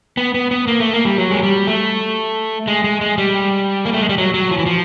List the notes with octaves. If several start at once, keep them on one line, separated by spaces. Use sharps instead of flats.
B3
B3
B3
A#3
A3
A#3
G3
F#3
G#3
G3
A3
G#3
G#3
G#3
G3
A#3
A3
G#3
G3
F#3
F#3
F3
E3
F3